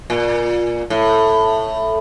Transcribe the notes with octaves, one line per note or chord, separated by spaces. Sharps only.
A#2
A2